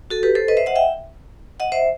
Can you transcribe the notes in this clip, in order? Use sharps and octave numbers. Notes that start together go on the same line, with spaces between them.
F#4 A4
G4 B4
A4 C5
B4 D#5
C5 E5
D#5 F#5
E5 G5
D#5 F#5
C5 E5